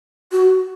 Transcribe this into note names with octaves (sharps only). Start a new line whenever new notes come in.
F#4